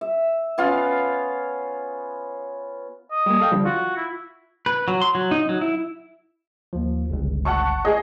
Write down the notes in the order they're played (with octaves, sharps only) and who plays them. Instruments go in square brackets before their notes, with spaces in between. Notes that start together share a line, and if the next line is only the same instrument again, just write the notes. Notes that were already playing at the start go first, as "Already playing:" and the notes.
[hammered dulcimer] E5
B3 C#4 F4 F5
[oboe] D#5
[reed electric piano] G3 A#3
A4 F5 G5
D3 F3 G3
[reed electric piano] F4 [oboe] F#4
[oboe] E4
[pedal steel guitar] B4
F#3
C6
F#3
D#4
F#3
E4
[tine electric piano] D#2 F3
G1 C#2
[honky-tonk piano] F#5 A5 C#6
G#4 D#5